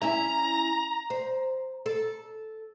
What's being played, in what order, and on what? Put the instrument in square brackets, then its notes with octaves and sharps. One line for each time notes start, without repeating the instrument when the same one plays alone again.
[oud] C#4 E4 E5 [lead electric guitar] A#5
[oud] C5
A4